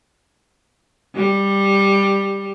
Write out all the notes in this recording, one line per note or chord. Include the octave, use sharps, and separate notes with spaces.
G3